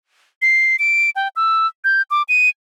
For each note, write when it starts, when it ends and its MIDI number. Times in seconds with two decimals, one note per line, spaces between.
0.42 0.76 96
0.79 1.10 98
1.16 1.28 79
1.36 1.67 88
1.84 2.02 91
2.11 2.23 86
2.29 2.49 99